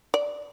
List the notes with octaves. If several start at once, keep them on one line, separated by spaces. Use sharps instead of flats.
D5